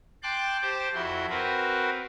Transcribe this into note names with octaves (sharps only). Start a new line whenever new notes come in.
G5 A5 C6 D6 F#6
G4 C5 A5 D6
F2 E4 F#4 C6
C4 F#4 A#4 B4